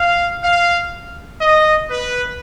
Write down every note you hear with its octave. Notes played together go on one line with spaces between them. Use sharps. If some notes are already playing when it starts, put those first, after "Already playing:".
Already playing: F5
F5
D#5
B4